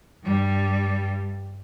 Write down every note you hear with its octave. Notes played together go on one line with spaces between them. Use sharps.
G2 G3